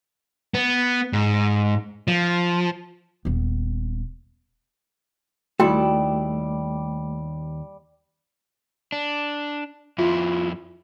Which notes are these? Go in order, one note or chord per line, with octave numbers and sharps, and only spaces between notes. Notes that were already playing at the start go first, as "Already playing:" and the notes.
B3
G#2
F3
D#1 B3
D#2 G3 A3 E4 F#4 D5 G5
D4
F2 E4 F4